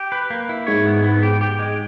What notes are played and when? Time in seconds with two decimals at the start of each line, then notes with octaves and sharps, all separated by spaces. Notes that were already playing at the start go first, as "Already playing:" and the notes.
Already playing: G4
0.12 B4
0.30 A#3
0.49 E4
0.67 G#2 C#5
0.86 B3
1.04 B3
1.23 G4
1.41 G4
1.59 G#3